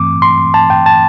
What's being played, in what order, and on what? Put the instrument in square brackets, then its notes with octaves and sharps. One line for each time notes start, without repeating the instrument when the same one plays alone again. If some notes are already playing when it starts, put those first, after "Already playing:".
Already playing: [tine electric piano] G2 E3 A3 C4 D6
C6
A5
G5
A5